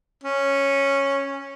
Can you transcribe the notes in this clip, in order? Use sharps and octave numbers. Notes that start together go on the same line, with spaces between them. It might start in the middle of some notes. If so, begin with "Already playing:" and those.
C#4